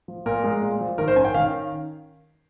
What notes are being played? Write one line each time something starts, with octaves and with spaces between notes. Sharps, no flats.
F3
A#2 A#4
G#3
A#2
F3
D#3 A#4
C5
C#4 G#5
G5
D#3 F5